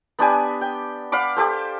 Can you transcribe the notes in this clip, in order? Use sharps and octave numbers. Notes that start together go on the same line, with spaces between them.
B3 D4 G4 G#5
G5
F5 F#5 B5 D6
G4 A4 C5